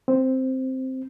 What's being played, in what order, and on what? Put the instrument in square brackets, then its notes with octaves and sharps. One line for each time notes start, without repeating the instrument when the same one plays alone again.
[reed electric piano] C4